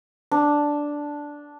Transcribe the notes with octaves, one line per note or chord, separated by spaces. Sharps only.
D4